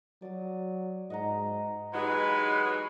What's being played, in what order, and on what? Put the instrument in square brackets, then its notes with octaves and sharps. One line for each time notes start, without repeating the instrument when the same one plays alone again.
[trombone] F#3 [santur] D5 D#6
[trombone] G#2 [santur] D#5 F#5 A#5
[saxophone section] E3 F#3 G#3 [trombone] D#4 [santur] F#4 G4 D#5 [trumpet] B4